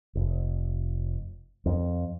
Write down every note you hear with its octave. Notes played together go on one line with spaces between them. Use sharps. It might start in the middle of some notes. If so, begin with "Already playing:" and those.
F1
F2